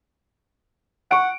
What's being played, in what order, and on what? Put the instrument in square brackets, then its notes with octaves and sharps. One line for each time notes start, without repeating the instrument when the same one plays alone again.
[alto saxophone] F#5 [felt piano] C#6 D7